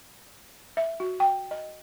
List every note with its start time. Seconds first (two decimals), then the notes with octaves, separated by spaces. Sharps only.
0.77 E5
1.00 F#4
1.20 G5
1.51 D#5